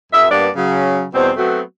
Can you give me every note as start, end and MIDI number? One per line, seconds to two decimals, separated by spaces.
0.12 0.25 42
0.12 0.25 68
0.12 0.25 76
0.30 0.47 43
0.30 0.47 58
0.30 0.47 59
0.30 0.47 62
0.30 0.47 74
0.56 1.04 49
0.56 1.04 54
1.13 1.30 40
1.13 1.30 47
1.13 1.30 55
1.13 1.30 60
1.13 1.30 72
1.36 1.60 54
1.36 1.60 57
1.36 1.60 59
1.36 1.60 60
1.36 1.60 66